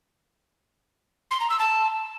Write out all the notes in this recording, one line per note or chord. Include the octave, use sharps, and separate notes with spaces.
C6
A#5
E6
A5